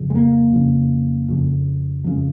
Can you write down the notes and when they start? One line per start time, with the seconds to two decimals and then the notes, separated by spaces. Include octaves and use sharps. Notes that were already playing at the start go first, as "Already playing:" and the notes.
Already playing: F2 C#3
0.10 G#3
0.15 A#3
0.52 F2 C#3
1.28 F2 C#3
2.04 F2 F#3
2.07 C#3 G#3